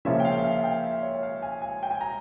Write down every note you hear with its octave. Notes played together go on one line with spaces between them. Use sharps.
C#3 F3 A#3 C#4 F4 E5
G5
F5
E5
F5
F5
G5
E5
C#5
F5
G#5
G#5
G5
G#5
A#5